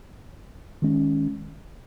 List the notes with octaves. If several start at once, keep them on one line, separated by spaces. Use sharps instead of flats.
D#3 G#3 C#4